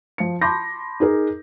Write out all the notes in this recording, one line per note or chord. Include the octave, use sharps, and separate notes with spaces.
F3 C#7
A5 B5 C6 D6 G6 A#6
D#4 G#4 A#4